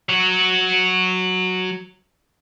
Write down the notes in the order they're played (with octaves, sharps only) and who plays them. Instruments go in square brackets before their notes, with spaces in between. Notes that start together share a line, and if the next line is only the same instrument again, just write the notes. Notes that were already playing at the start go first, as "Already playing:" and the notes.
[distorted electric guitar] F#3 F#4